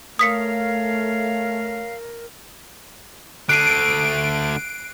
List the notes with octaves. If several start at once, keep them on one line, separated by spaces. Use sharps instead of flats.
A3 A#4 C#5 F5 D#6 B6 C#7
D3 A3 F#6 C7 D7 D#7